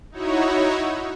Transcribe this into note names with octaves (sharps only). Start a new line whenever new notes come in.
D#4 E4 F#4 C#5